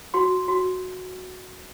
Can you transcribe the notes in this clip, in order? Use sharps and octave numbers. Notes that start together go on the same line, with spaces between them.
F#4 C6
F#4